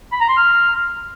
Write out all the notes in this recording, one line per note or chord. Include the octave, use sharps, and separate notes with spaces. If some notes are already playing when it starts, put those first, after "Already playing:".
B5
A#5
C6
F6